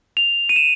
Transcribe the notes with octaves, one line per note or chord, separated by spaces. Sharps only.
F7
D#7
E7